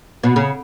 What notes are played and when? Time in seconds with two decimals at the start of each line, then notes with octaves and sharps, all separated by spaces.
0.24 B2
0.36 C#3